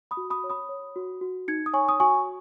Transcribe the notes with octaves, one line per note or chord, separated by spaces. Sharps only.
B5 D#6
F#4
B5 D#6
C#5
B5 D#6
C#5
F#4
F#4
D#4 G#6 C#7
D#6
C#5 G#5 C#6
D#6
F#4 G#5 C#6